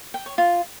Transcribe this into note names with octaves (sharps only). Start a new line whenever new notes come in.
G5
C#5
F4